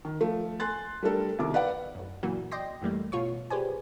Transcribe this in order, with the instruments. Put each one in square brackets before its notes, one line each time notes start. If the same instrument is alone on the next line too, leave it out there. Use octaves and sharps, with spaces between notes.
[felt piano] D#3
F3 A3
G#5 C6 F#6 A6
G3 A3 D4 A4 A#4
C2 B2 D#3 D6
B4 D5 F5 F#5
[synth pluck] A1 F#2
A#2 E3 F#3 A#3 F#4
D5 D#5 G5 C6 A#6
F#2 E3 G3 A3 A#3
A1 B2 F4 C#5 C#6
G4 G#4 B4 C5 D5 G#5